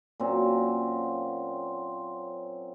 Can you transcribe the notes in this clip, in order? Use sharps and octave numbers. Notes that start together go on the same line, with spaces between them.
A#2 F#3 C4 C#4